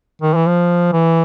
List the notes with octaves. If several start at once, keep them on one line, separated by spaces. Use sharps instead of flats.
D#3
E3
F3
E3